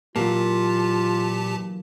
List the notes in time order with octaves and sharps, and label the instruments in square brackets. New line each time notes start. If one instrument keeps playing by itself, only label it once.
[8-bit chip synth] A#2 G4 A5 [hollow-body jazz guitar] E3 F#3 A#3 [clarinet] F4